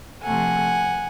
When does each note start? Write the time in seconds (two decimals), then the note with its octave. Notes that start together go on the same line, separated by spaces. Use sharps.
0.23 C3 F3 A3 F#5 G#5